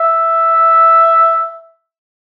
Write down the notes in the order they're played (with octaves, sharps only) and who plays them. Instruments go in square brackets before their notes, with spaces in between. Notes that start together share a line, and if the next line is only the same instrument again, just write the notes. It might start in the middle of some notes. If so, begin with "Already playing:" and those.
Already playing: [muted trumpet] E5